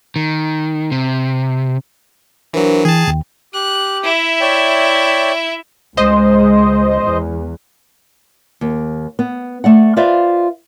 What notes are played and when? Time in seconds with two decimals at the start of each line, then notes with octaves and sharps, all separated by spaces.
0.16 D#3
0.92 C3
2.53 E3 F#3 D4 A#4 C5
2.85 E3 G#4 G5 A5
3.07 D#2
3.54 G4 F#6
4.04 E4 E5
4.41 C#5 D5 G5
5.97 C#2 G#3 C5 D#5
7.03 E2
8.61 D#2
9.19 B3
9.64 A3 D5 F#5
9.97 F4 B4 C5 D5 E5 F5